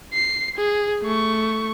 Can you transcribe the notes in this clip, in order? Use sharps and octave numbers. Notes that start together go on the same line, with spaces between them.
C7
G#4
A3 C#6